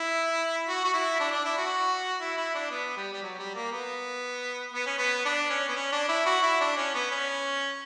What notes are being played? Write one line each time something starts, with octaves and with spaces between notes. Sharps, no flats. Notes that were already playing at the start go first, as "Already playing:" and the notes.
Already playing: E4
F#4
F#4
E4
D4
D4
E4
F#4
E4
E4
D4
B3
G3
G3
F#3
G3
A#3
B3
B3
C#4
B3
D4
C#4
B3
C#4
D4
E4
F#4
E4
D4
C#4
B3
C#4